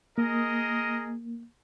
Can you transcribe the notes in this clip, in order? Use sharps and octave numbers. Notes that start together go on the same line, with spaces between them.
A#3 G#4 A#4 D#5